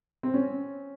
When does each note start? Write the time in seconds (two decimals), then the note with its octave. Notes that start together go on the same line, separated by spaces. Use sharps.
0.23 C4
0.34 C#4